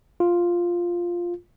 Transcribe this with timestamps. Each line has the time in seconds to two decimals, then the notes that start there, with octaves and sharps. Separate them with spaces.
0.20 F4